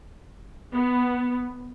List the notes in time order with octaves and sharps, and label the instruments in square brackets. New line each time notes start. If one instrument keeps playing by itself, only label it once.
[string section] B3